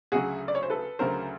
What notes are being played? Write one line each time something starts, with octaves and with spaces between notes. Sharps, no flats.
D2 C#3 F#3 F#4 G#4
D5
C#5
C5
A4 B4
D2 C#3 F#3 A#4 C5